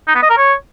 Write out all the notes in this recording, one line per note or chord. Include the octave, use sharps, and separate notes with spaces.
D#4
B3
D#5
A#4
C#5